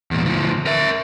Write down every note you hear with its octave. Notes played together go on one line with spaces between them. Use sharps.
E2 A#2
D2 F3
A#4 E5